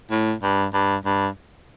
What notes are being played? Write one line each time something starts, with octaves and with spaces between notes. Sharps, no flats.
A2
G2
G2
G2